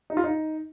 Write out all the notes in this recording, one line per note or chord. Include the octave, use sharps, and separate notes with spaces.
D#4
F4
D#4